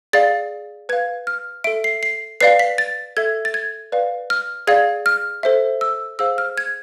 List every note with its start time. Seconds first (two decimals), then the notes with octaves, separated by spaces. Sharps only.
0.13 G#4 D5 F5 A6
0.89 B4 F5 G#6
1.27 F6
1.64 A4 E5 D7
1.84 C7
2.03 C7
2.41 B4 D5 F5 C7
2.59 B6
2.78 A6
3.17 A4 E5 G#6
3.45 A6
3.54 G#6
3.92 B4 D5 F5
4.30 F6
4.67 G#4 D5 F5 G#6
5.06 F6
5.43 A4 C5 E5
5.81 E6
6.19 G#4 C5 F5 E6
6.38 F6
6.58 G#6